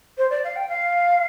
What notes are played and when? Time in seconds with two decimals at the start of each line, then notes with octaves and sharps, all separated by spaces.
0.18 C5
0.30 D5
0.44 F5
0.56 G5
0.69 F5